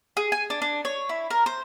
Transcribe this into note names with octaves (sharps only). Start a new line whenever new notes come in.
G#4
G#5
D4
D4
C#5
E4
A#4
C5